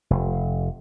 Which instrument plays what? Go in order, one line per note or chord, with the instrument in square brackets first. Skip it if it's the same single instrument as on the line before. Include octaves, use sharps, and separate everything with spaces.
[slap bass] F1